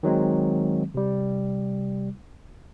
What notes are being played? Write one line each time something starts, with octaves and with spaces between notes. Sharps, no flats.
D#3 F#3 G#3 C4
C3 G3